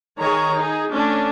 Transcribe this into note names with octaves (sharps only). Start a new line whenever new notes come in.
D#3 G#4 C#5 A#5
D#4 G#4
A3 C#4 D4